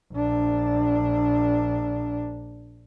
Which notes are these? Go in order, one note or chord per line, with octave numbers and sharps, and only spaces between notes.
A#1 D4